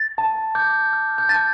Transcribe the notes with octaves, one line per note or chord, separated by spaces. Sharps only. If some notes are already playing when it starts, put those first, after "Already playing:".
Already playing: A6
A5
D6 G6
F6
G6
A5 A6